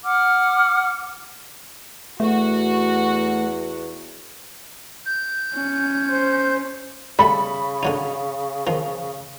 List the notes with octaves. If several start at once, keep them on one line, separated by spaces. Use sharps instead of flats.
F#5 D6 F6
E2 A3 F#4 F#5
G6
C#4
C5
C#3 G3 A4 E5 B5
D3 F#3 D#4
D#3 F3